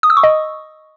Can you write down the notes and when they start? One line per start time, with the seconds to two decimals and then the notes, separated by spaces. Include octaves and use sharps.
0.03 D#6
0.10 E6
0.17 C#6
0.23 D#5